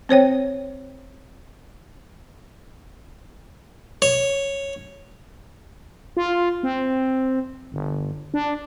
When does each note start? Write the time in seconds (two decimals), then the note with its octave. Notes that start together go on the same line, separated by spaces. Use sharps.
0.09 C4 C5 C#5 G5
4.02 C#5
6.17 F4
6.63 C4
7.72 G1
8.34 D4